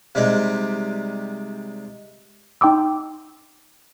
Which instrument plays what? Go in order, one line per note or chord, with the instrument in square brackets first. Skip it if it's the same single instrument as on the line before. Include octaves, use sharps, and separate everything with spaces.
[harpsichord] C3 G3 G#3 D#4
[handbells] D#4 G5 C6 D6 E6